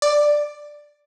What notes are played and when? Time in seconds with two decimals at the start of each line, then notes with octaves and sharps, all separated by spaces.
0.02 D5